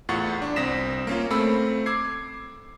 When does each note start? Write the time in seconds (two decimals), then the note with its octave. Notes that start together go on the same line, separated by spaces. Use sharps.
0.09 E2 A2 F4 F#5 C#6 A6
0.42 D4
0.56 C2 C4 D#6 A#6 B6 E7
1.07 A#3 C#4 F4
1.31 A3 C4 B5 E6
1.86 D6 E6 G#6 C7